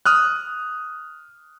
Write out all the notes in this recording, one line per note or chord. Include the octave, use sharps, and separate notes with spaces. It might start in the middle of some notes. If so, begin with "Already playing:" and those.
D#6 F6 F#6